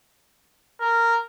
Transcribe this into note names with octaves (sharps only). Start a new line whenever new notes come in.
A#4